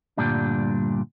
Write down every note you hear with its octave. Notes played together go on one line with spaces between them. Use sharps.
D2 G2 A#2 G3 D4